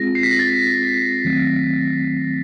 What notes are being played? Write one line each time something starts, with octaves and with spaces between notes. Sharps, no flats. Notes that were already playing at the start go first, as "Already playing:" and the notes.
Already playing: G#3 C4 F4 G#4 A#6
C7
B6
A#6
A6
D#3 F#3 A3 C4